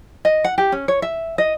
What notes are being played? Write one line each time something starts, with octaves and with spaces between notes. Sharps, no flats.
D#5
F#5
G4
C#4
C#5
E5
D#5